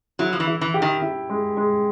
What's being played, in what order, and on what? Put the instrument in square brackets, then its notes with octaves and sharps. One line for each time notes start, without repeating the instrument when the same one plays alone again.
[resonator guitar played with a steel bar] F#3 [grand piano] E4
[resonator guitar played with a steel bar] F3
E3
[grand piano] E4
[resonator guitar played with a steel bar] E3
[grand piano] G4
[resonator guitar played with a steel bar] D#3
[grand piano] E4
G#3
G#3